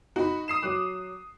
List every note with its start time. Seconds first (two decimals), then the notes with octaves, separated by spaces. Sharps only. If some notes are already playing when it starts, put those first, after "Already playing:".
0.16 D#4 F#4 B5
0.48 D#6 C7 E7
0.62 F#3 D6 F#6